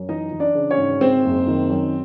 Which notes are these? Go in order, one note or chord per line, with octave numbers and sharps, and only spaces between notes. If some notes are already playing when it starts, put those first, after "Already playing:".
Already playing: F#2
E3 D#4 D#5
E3
D4 D5
C#3
C#4 C#5
G#1
G#3 C4 C5
F#1
D#3
F#2